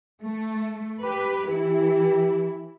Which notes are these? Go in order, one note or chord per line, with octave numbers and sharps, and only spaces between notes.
A3
G4 B4
E3 E4 G4